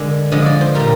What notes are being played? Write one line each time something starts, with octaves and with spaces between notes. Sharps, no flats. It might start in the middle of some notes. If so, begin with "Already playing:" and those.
Already playing: D3 G#3 A#4 D5
D3 F3 G#3 D#5
D5
C5
A#2 G3 A#4